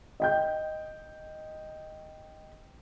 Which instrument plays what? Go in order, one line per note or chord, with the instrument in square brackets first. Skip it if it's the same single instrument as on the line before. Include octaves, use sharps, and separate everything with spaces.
[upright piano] D#5 G5 G6